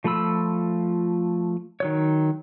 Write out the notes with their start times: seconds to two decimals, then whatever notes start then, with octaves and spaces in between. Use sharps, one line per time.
0.04 F3 A3 F4 B5 E6
1.80 D#3 F#3 C#5